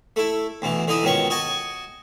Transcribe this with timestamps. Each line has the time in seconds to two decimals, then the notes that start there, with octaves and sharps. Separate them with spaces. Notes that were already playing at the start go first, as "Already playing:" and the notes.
0.16 A3 E4
0.62 D2 B2 E3
0.88 D3 E3 D#4 E4 D#6
1.03 C#2 B2 D#3 C#4 C#6
1.30 F#4 D#5 G#5 A5 C#6